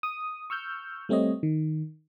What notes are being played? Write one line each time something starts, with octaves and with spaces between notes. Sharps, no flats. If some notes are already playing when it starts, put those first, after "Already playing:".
D#6
C#6 E6 F6 G6
G3 A3 C4 C#5 D#5
D#3